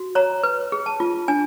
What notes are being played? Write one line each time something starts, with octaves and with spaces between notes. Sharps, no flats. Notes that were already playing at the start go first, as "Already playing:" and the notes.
Already playing: F#4
C#5 A#5
B4
G#4
A5
F4
D4 G#5